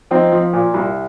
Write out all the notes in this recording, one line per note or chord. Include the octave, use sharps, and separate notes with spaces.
F3 C4 D#4
F3
A#2
C2